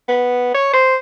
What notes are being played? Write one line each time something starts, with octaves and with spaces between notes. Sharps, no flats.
B3
C#5
C5